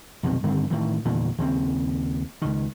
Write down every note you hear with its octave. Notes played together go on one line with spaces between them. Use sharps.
B1 F2 C3 D#3
G2 D3 D#3 C4
A2 D#3 E3
E2 A#2 D3 D#3
D#2 C#3 A#3 C4
C#2 D#3